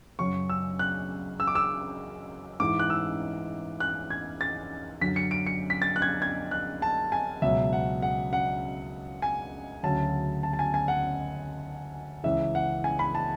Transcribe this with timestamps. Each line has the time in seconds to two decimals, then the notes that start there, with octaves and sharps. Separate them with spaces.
0.19 F#2 C#3 F#3 C#6
0.49 E6
0.79 F#6
1.40 E6
1.47 D6
1.55 E6
2.60 G#2 E3 D6
2.79 F#6
2.90 E6
3.80 F#6
4.10 G#6
4.41 A6
5.01 F#2 D3 F#3 B6
5.16 C#7
5.31 D7
5.47 C#7
5.70 B6
5.82 A6
5.96 F#6
6.02 G#6
6.22 G#6
6.51 F#6
6.82 A5
7.12 G#5
7.42 C#2 B2 F#3 E5
7.73 F#5
8.02 F#5
8.33 F#5
9.22 G#5
9.83 D2 C#3 F#3 A5
10.43 A5
10.53 A5
10.59 G#5
10.74 G#5
10.88 F#5
12.24 C#2 C#3 E3 E5
12.55 F#5
12.84 G#5
12.99 B5
13.15 A5